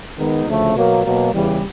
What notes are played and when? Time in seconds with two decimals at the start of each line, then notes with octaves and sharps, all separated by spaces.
0.17 D#3 G#3 B3 D#4
0.46 D2 C#3 F3 A3
0.75 B2 F#3 A#3
1.04 B2 F#3 A#3
1.34 E2 C#3 E3 G3